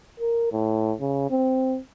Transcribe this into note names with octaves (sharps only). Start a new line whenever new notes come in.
A#4
A2
C#3
C4